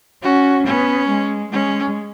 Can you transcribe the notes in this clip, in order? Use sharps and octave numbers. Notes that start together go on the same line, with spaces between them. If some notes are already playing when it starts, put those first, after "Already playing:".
C#4 F#4
B3 C#4
G#3
G#3 C#4